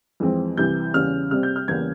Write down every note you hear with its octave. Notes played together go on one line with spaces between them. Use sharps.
F2 E3 G#3 C4
C2 C3 E3 G6
E2 C#3 G3 C#4 F6
C3 G3 C4 F6
G6
F6
E2 C#3 G3 A#3 C#4 G#6